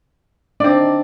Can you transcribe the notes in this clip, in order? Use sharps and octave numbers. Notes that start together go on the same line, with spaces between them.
C4 D4 D#4 D5